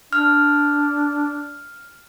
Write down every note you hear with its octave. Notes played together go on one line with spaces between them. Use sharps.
D4 F6